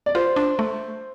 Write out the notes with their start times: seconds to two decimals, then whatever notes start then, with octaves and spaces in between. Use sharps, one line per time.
0.06 D5
0.15 F4 C5
0.36 D4
0.59 A3